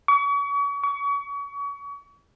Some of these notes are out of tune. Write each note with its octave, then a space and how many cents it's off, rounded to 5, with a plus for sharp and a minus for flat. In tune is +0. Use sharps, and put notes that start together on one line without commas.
C#6 +40
C#6 +35